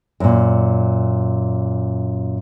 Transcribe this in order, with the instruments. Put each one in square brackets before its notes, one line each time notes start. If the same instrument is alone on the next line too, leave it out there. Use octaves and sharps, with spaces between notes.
[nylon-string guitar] F#2 A#2